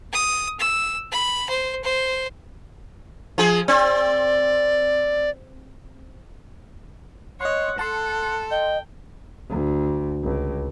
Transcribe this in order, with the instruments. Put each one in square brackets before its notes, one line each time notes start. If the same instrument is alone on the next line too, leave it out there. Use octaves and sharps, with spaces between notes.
[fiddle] D#6
E6
B5
C5
C5
[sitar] F3 G#4
[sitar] C4 [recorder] D5
[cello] C#5 [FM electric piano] D#5 C6 [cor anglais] F#5
[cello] A4 [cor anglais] F#5 [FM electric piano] A5 C6
[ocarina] D#5 [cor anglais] G5
[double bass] D2
C#2